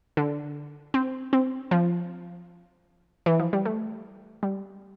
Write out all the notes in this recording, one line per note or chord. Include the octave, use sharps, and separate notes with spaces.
D3
C4
C4
F3
E3
F3
G3
A3
G3